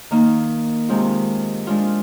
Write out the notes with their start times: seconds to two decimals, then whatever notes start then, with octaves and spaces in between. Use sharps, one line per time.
0.11 D#3 A#3 D#4
0.88 C3 D#3 G#3 C4 F4
1.67 F3 G#3 D4 F4